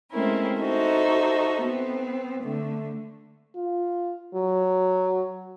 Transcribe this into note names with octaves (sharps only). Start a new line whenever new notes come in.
G#3 A3 C4 C#4 E4 A#4
D#4 F#4 A4 C5 E5
B3 C4
D3 A3
F4
F#3